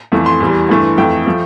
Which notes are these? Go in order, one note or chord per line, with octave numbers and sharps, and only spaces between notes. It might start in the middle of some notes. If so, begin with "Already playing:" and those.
F2 E3 A3
C6
E2 E3 G3
G2 E3 A3
F2 E3 A3 G5
F3 A3